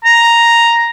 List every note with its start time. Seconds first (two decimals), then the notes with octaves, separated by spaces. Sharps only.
0.05 A#5